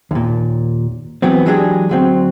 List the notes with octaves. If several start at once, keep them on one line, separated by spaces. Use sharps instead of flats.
D#2 A#2
E3 F#3 B3 C4
E3 F#3 G#3 D4 G4 G#4
D2 F#3 C4